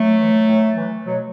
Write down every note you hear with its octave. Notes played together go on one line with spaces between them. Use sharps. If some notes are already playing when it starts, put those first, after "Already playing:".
Already playing: F#3 A3
E3
A2
E3
B2 F#3